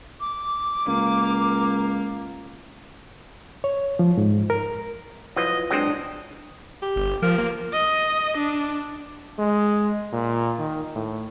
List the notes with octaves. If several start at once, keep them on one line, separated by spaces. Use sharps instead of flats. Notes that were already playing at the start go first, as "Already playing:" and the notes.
D6
C#2 A#3
C#5
F3
G#2
A#4
F3 F#3 E4 F4 B4 D#5
F#3 G#3 C4 D4 D#6
G4
G1
F3 A#4
A#3
D#5
D4
G#3
A#2
D#3
A2